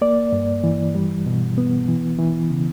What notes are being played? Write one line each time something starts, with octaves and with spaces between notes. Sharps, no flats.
A#3 D5
G2
E3
G3
B2
B3
E3
E3
C#3